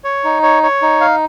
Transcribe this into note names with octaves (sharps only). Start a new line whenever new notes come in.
C#5
D#4
C#5
C#5
D#4
F5